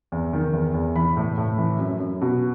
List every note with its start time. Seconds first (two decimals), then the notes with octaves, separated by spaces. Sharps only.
0.12 E2
0.33 D#3
0.53 E2
0.74 E2
0.95 E3 B5
1.17 A2
1.38 A2
1.58 E3
1.79 F#2
2.00 F#2
2.21 B2